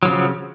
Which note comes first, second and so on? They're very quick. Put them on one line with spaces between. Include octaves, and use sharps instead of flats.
F#3 F3 C#3